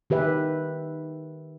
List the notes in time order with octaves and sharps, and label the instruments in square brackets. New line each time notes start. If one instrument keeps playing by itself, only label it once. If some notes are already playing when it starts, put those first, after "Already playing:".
[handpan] D#3 G4 B4 E5